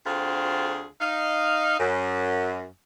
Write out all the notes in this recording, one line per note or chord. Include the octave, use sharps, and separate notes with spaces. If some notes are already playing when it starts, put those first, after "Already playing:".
D2 D3 C4 F4 F#4 G#4
D#4 F5
F#2